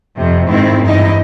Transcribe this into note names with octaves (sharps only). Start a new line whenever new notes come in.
F2 C3
G#2 D#3 C4 E4
E2 G2 D#4 E4 D#5